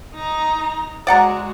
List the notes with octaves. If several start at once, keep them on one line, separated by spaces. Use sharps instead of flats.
D#4 A#5
G#3 F#4 D5 F#5 A#5